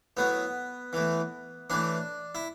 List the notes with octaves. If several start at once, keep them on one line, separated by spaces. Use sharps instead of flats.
A2 F#3 B3
A2 E3
A2 E3 D4
E4